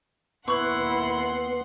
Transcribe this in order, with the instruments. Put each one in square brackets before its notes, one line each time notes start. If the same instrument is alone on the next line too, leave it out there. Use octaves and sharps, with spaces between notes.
[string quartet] D#2 F#5 C6 [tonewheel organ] B3 [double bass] E4 [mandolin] C#6 F#6